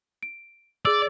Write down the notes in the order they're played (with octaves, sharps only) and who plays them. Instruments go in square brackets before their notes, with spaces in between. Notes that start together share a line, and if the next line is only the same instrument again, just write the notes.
[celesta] D7
[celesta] G#4 E6 [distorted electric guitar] D5